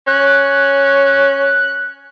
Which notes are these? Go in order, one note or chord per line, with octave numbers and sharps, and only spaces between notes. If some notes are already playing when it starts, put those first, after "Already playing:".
C#4 F#6